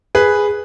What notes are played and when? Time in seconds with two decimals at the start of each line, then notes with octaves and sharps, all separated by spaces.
0.15 G#4 B4